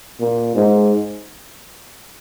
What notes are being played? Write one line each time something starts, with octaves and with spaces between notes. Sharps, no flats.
A#2
G#2